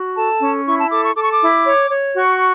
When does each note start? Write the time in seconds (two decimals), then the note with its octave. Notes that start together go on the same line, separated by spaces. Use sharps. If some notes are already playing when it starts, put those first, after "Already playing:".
Already playing: F#4
0.15 A4 A5
0.40 C#4
0.66 E4 C#6
0.78 A5
0.90 A4 D6
1.03 C#6
1.15 A4 D6
1.23 C#6
1.31 D6
1.41 E4
1.66 C#5
1.91 C#5
2.16 F#4 C#6